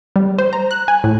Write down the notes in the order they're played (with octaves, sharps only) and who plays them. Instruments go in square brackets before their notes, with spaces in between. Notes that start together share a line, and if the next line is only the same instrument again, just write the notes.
[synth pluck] G3
C5
A#5
F#6
G#5
A2